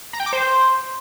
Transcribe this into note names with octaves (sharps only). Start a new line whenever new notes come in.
A#5
G5
D6
C5